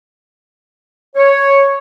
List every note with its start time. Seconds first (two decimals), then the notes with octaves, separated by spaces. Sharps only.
1.16 C#5